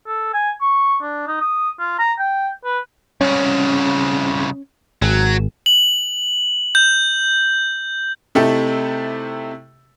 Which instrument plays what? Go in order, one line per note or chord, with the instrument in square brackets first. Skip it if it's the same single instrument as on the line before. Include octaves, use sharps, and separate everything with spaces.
[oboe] A4
G#5
C#6
D4
D#4
D#6
F4
A#5
G5
B4
[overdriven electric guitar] C2 C#3 [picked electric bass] C#4
[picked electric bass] G#1 [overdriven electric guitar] F#3
[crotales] F#7
G6
[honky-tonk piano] C3 A3 D#4 E4 G4 A4